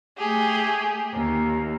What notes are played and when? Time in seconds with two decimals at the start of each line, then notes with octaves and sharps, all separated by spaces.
0.17 A3 G4 G#4
1.14 D#2